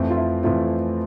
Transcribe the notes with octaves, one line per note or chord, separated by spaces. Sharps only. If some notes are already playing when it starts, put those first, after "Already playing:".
Already playing: F2 E3 A3 C4
F4
E4
F2 E3 A3 C4 F4